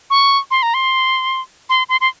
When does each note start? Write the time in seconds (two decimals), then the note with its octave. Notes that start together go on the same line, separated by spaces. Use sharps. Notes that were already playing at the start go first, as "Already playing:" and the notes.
0.10 C#6
0.51 C6
0.63 A#5
0.74 C6
1.70 C6
1.89 C6
2.01 C6